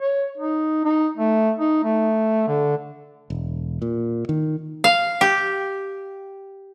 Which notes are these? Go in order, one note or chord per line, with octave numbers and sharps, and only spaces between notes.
C#5
D#4
D#4
A3
D#4
A3
D3
E1
A#2
D#3
F5
G4